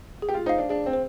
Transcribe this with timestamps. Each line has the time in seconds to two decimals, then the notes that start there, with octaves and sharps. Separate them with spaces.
0.22 G#4
0.29 G4
0.34 F4
0.46 D#4 C5 F5
0.58 D4
0.69 D4 G#4
0.86 C4
0.93 C5